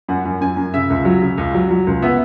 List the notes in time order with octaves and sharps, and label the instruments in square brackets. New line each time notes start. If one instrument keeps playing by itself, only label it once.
[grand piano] F#2 F#5
F#2
F#2 G#5
F#2
C#3 E5
C#2
F#3
C#3
C#2
F#3
F#3
C#2
B3 E5